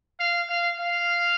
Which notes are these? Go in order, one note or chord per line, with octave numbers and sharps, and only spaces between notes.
F5
F5
F5